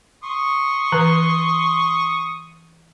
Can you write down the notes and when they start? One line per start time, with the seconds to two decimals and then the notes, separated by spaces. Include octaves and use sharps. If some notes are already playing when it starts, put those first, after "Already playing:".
0.24 C6 C#6 D#6
0.92 E3 B4